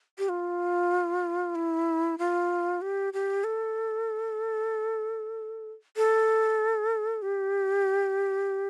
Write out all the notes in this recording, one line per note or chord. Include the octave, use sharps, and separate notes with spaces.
G4
F4
E4
F4
G4
G4
A4
A4
G4